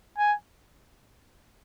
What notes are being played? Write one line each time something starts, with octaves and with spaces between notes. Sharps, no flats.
G#5